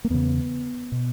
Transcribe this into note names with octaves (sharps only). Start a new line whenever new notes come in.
A#3
E2 C#3 B3
B2